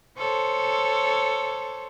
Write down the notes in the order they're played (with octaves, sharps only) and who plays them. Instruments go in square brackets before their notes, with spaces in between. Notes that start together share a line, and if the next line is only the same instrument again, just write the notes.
[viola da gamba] A4 C5 C#5